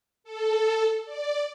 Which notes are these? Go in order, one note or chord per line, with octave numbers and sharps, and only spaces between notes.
A4
D5